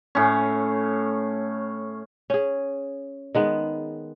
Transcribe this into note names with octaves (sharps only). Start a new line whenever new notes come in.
A2 C#4
C#4 G#4
D#3 G#3 B3